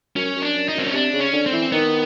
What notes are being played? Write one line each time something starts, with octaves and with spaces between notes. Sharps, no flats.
F#2 C#4
F#2
D4
F#2
D#4
F#2 C4
C#4
C3 D4
C#3
C#4
D3
C4
E3
D#3 B3